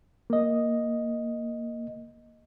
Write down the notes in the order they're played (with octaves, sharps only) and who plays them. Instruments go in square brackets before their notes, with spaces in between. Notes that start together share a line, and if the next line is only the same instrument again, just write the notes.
[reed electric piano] A#3 D#5